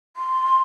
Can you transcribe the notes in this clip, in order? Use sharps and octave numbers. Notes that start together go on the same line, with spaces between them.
C6